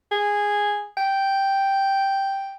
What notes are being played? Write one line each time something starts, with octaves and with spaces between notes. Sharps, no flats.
G#4
G5